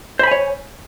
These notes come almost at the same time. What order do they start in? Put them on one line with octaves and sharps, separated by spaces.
C5 B5 G#5 C#5